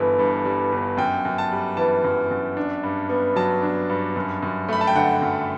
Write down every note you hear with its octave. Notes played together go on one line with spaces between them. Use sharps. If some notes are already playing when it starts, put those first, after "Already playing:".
Already playing: G1 E3 G3
G2
G3
G1
F#2 G5
F#2
A5
G3
E3 A5
F#2
F#2
D4
G2
B3
F#3 A5
D4
G2
F#2
F#2
A3 B5
A5
G5
D3 F#5
F#2